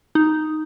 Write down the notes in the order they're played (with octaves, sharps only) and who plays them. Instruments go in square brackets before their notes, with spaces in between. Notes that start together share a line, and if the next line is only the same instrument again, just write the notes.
[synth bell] D#4